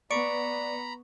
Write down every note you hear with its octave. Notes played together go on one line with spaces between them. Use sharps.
B3 D5 A#5 B5 C#6 C#7 D7